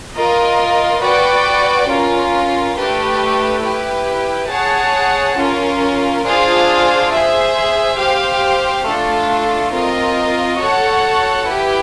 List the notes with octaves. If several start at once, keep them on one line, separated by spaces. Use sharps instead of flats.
F4 A#4 D#5
F#4 B4 D5 G5
C#4 F4 A#4
A3 D4 G4 B4
E4 G4 B4
G#4 C#5 F#5 A5
C#4 F4 A#4
D4 F4 G#4 C5 F5
G#4 C5 E5
G4 C5 F5
A3 D4 F4 A4
C4 F4 A#4 D#5
F#4 A4 C#5 F#5 A5
E4 G4 B4